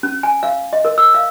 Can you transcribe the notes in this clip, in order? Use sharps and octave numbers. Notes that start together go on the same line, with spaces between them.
C#4
G#5
F5
D#5
A#4
E6
F5